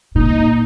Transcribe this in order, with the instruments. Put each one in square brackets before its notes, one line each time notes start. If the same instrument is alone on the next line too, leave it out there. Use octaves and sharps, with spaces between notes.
[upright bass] A#2 [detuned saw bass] D#4